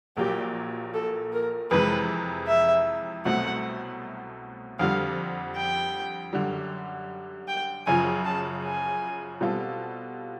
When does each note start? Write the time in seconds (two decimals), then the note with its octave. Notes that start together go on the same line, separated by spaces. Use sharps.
0.17 A#1 A#2 F#3 A#3 G4
0.94 A4
1.33 A#4
1.71 F2 C3 E3 G#3 B4
2.47 E5
3.25 C2 B2 F#3 A3 C4 F#5
4.79 F2 D3 G3 F5
5.56 G5
6.33 F#2 D3 G3
7.48 G5
7.87 F#2 C#3 F3 G#5
8.25 A5
8.63 G#5
9.41 B2 G3 C4 F4 A4